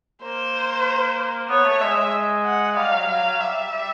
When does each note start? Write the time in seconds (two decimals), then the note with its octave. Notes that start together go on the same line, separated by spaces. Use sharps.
0.23 A#3 C5
1.49 B3 C#5
1.65 A3
1.81 G#3 E5
1.97 G#3
2.45 F#5
2.77 G3 F5
2.92 F#3
3.08 F#3 F5
3.24 F#3
3.40 G3 E5
3.71 G3